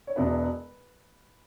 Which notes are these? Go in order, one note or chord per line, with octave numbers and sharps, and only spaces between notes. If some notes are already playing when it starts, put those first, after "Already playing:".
C#5
E1 E2 B2 B3 E4 B4